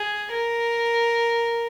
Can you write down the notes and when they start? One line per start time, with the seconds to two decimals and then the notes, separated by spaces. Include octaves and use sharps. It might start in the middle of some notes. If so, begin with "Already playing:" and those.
Already playing: G#4
0.31 A#4